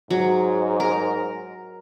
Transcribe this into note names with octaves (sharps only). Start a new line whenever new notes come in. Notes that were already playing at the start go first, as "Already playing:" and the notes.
G#2 F#3
A#4